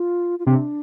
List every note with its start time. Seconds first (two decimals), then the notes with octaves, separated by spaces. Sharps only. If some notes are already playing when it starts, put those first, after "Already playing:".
Already playing: F4
0.39 F4
0.46 C3 D4